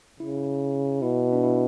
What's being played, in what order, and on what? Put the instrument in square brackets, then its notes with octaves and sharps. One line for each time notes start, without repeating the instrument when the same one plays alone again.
[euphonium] C#3 [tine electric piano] E4
[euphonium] B2 [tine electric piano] E4
[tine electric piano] D4
E4